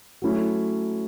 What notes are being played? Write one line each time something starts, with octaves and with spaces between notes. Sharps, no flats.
F#3 A3 C#4 E4